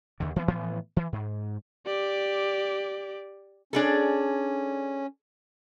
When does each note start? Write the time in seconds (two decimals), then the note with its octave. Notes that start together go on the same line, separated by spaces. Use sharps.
0.20 D#2 D3
0.36 E3 F3 G#3 B3
0.48 A2 E3 F3 B3
0.97 E3
1.12 G#2
1.86 G4 D5
3.73 C#4 D4 G#4 A4